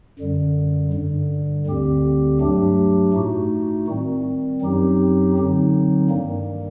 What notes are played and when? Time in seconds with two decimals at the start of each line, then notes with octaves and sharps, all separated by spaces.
0.19 F#2 D3 G3
0.92 G2 D3 G3
1.67 D2 D3 G3 C4 G4
2.40 G2 F#3 A3 D4 G4
3.14 A2 A3 D#4 F#4
3.88 D#3 G3 C4
4.62 F#2 F#3 C4 D#4 G4
5.36 D3 F#3 C4 D#4
6.09 G2 D#3 G3 A#3